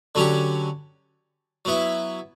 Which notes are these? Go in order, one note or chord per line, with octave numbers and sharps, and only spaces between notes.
D3 F#3 C#4 G4
F#3 B3 E4